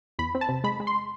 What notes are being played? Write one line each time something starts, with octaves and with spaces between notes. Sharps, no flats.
E2 B5
C4
A5
C3
G#3 B5
G#3
C6